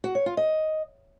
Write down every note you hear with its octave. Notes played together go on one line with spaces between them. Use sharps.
F#4
C#5
F4
D#5